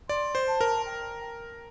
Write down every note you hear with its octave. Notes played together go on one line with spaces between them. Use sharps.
D5 C6
C5
A5
A#4
G5